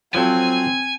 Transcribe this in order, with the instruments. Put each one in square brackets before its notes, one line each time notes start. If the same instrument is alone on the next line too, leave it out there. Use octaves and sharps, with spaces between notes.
[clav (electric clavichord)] F3 F#3 A4 [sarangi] C4 [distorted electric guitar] G#5